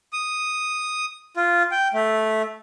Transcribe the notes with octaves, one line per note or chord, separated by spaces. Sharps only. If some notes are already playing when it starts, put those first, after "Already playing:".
D#6
F4
G5
A3